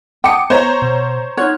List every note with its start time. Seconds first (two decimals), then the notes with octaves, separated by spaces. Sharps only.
0.24 F#5 G5 A5 D6 D#6 C#7
0.50 B3 C5 C#5 A#5
0.82 B2
1.37 D#4 F4 C#5 F#5 F#6 G#6